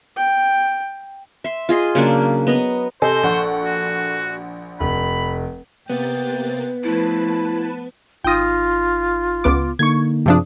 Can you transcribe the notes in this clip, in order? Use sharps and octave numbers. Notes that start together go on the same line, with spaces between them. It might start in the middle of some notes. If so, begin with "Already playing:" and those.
G5
E5 C6
F4 G#4 D#5 C6
C#3 F#3 A#3 D4
B3 D#5 A#5
C3 A4 C5 D#5 G#5
A#1 F#5 C#6
F#4
F1 B5
C3 A#3 B3 G5 A6
F3 A3 E4 B4 A5
G#1 D#4 F4 G5 D#6 A#6
C#2 B3 D6
D3 A#3 D#4 C#6 G#6
F#2 C3 F3 D4 G#4 D#6